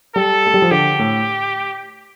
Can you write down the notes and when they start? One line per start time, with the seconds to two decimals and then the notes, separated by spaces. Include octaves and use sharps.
0.15 G3 A4
0.46 A3
0.54 G3
0.62 F3
0.71 D3 G4
0.99 A2